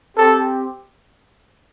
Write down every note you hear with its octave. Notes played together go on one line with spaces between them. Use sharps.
C4 G4 A4